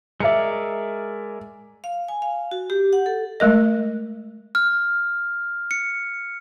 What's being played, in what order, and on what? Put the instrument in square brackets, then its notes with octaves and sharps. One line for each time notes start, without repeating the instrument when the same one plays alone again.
[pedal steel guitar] G#3 A#4 D5 [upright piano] E5 C#7
[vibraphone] F5
G#5
F5
F#4
G4
F#5
A4
[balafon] G#3 A3 A#4 D#5
[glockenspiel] F6
C#7